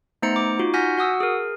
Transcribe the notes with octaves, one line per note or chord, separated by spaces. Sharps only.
A3 B3 D#4 C5 A#5 C#7
D6
D#4 F4 F#4
F#5 G#5 F6 G6 A#6 B6
F#4 F#5 D#6 E6
G#4 A#4